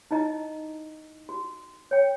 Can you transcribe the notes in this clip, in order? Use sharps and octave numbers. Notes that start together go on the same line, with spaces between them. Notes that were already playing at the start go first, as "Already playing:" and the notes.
D#4 E4 D#5 A#5
F#4
C#5 G5